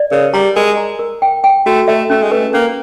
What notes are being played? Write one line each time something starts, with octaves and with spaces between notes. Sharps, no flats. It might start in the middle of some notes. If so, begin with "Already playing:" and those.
Already playing: D5
C#3 A#4
G3 A#5
G#3 A#4
A#5
A#4
G5
G5
A3 F#4
A3 E5
A3 C#4
G#3
A3 B4
A#3 C#4